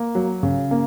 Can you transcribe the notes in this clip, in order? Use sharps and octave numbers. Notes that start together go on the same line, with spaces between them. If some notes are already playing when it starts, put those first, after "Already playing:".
Already playing: A#3
F#3
C#3
A#3